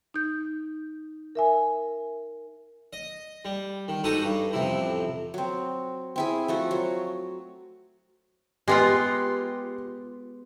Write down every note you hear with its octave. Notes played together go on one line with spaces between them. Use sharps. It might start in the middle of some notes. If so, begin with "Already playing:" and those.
D#4 G6
A#4 E5 G#5
D#5
G3
D#3
G#2 D#4 F#4 G4 A4 D#6
G2
A1 F2 C3 E4
F#3 C4
C4 E4 G#4
F3 A3 F#4
F#3
G#3 B3 F4 G4